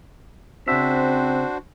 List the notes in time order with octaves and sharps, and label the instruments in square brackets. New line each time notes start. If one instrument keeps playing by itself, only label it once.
[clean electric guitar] C#3 E5 [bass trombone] C4 [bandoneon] D4 F#4 C5